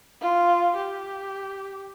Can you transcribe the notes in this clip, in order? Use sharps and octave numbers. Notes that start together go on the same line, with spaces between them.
F4
G4